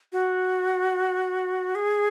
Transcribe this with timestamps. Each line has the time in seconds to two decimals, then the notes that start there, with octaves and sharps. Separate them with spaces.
0.13 F#4
1.75 G#4